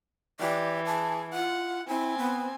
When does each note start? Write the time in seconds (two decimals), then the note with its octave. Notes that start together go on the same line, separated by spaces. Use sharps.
0.40 E3 G4 D5
0.86 G#4 A5
1.33 F4 F#5
1.88 C4 E4 G#5
2.18 B3